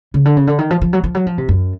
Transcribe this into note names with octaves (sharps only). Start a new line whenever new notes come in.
C#3
D3
C#3
D3
D#3
F3
F3
F#3
F3
F#3
F3
C3
F#2